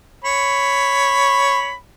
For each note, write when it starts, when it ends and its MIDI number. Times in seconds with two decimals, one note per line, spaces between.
0.24 1.74 73
0.24 1.74 83